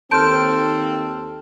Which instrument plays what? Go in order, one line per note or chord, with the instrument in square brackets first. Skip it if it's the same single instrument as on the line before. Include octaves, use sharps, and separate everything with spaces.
[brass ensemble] D#2 C4 [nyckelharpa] A4 [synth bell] A5 F6 [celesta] C6 G6 D7